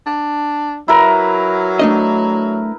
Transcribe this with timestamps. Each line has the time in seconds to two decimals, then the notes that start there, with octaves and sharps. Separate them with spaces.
0.06 D4
0.88 F#3 E4 A#4 B4
1.79 A3 D4 D#5